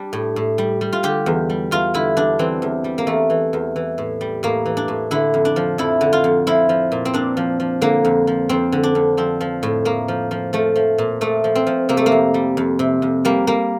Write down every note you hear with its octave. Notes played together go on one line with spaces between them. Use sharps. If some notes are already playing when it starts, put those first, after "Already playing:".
Already playing: G3 D4
A2
A2
G3
G3
F4
D3 G4
E2
G3
E2 F4
D3 E4
E2 D4
E3 C4
E2
G3
A#3
E2 A3
E3
E2
E3
A2
G3
A2 A#3
E3
D4
A2
D3 E4
F2
D4
F3
F2 E4
D3
F4
F2
F3 E4
F3
A#2
C4
A#2 D4
F3
F3
D3 A#3
F2
F3
F2 C4
D3
D4
F2
F3 C4
F3
A2
A2 A#3
F3
F3
F3 A3
F3
A#2
A#2 A3
F3
C4
F3
C3 A#3
A3
A#3
F2
G3
F2
C3
F2
G3 A#3
G3 A#3